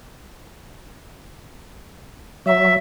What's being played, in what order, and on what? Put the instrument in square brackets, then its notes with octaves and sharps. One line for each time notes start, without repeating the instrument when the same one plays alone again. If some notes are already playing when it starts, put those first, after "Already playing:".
[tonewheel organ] F#3 [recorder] E5